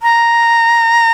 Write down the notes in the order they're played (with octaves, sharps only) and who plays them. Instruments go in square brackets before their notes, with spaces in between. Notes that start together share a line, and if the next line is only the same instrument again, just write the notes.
[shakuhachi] A#5